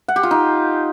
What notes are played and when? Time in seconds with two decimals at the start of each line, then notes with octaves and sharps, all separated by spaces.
0.08 F#5
0.16 G4
0.23 F4
0.31 D#4